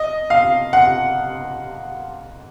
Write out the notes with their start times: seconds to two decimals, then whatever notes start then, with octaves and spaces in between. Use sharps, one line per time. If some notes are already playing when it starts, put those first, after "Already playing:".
Already playing: D#5
0.30 F5
0.73 F#5